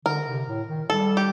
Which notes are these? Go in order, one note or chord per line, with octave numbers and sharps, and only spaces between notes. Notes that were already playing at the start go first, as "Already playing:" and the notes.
D3 A#4
C3
A2
D#3
G3 A4
G4